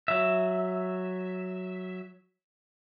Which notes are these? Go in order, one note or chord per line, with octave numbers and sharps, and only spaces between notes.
F#3 E5